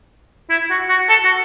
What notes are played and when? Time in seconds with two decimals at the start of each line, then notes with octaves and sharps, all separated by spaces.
0.50 E4
0.71 F#4
0.89 F#4
1.09 A4
1.25 F#4